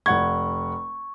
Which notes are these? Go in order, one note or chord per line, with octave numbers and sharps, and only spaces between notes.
F1 F#5 C#6 G#6